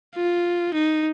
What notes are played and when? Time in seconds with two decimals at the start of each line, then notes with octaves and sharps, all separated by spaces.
0.16 F4
0.74 D#4